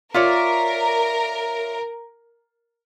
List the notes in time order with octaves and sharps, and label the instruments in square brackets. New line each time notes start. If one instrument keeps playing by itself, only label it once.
[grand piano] F4 [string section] A#4 [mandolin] C#5 D5 E5